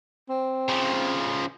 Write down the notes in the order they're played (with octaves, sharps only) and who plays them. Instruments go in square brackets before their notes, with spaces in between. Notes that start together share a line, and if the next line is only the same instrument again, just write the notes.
[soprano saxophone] C4
[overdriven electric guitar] C#3 F3